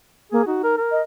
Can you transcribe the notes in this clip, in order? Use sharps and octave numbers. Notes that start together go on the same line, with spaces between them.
A#3 G#4
D#4 F#4
A#4
A#4
D#5